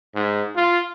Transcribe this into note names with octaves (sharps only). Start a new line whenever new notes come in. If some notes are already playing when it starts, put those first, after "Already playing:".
G#2
F4